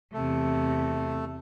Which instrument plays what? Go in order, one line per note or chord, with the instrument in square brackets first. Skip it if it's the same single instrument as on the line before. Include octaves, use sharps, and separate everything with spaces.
[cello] E2 C3 [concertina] A3